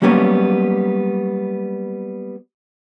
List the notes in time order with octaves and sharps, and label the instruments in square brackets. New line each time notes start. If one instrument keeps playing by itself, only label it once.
[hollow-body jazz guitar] F#3 G3 A#3 B3 C#4